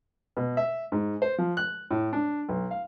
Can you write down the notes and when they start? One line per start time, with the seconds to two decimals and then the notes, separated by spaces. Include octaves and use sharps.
0.37 B2
0.57 E5
0.92 G#2
1.22 C5
1.38 F3
1.57 F#6
1.91 A2
2.13 D4
2.49 B1
2.71 F5